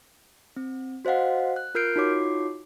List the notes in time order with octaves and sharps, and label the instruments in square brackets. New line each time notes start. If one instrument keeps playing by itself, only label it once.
[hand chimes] C4
F#4 C5 D#5 F5 F#5
F#6
F4 A#4 F6 G6 C7 D7
D#4 F4 F#4 C#5 D6 C7